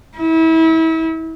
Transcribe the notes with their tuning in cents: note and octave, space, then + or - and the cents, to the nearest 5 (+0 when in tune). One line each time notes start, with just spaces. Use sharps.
E4 -30